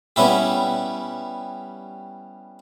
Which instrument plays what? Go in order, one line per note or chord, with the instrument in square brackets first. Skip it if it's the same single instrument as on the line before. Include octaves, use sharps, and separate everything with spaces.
[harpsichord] G3 B3 C#4 E4 G4